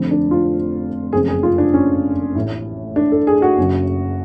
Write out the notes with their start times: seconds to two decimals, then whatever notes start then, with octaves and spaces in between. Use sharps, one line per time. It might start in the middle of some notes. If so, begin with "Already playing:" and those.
Already playing: F1 F2 D3
0.11 D4
0.31 F4
1.13 F#1 G#4
1.15 F2 C#3
1.28 G#4
1.43 F4
1.58 D4
1.74 C#4
2.35 A1 A2
2.96 D4
3.12 A4
3.27 G#4
3.42 F#4
3.58 F#1 F#2 C#3